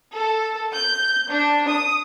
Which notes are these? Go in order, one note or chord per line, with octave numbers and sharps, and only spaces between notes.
A4
G6
D4
D#6